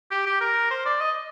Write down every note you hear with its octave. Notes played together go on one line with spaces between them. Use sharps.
G4
G4
A#4
C5
D5
D#5